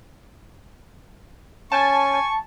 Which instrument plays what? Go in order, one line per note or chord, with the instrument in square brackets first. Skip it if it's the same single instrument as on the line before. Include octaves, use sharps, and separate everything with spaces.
[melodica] C#4 [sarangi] G#5 [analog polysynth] A5 [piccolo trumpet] C#6